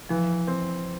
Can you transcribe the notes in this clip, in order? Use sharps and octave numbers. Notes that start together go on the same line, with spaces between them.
E3 F3
C4